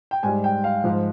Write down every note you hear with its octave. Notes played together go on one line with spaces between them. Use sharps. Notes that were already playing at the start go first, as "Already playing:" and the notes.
G5
G#2 G3 G#5
G5
F5
G#2 F3